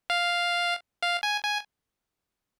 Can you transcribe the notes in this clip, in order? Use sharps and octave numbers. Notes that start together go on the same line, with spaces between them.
F5
F5
G#5
G#5